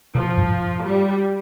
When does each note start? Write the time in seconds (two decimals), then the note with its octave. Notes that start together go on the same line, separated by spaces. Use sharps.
0.15 B2 F3
0.37 G2
0.83 G3